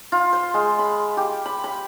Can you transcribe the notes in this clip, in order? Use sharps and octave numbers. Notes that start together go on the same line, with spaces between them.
F4
C5
G#3
B5
G4
B5
B5